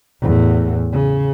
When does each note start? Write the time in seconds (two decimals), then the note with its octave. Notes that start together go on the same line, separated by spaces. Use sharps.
0.22 E2 A2
0.93 C#3